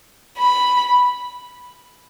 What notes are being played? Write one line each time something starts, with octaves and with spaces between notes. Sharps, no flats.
B5